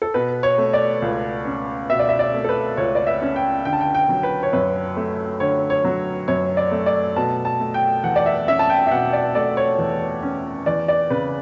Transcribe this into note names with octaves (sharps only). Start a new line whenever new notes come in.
A4
B2 B4
C#5
A3
D5
C#2
C#4
B2 E5
D5
E5
D5
A3
A4
B4
C#2 C#5
D5
E5
C#4
G5
D3 G5
A5
G5
G5
F#3
B4
C#5
F#2 B4
A3
D3 C#5
C#5
F#3
F#2 C#5
D5
A3
D5
B2 A5
A5
A3
G5
E2 F#5
D5
E5
C#4 E5
A5
G5
E5
B2 F#5
D5
A3 D5
C#5
E2
C#4
E2 D5
D5
C#3 B4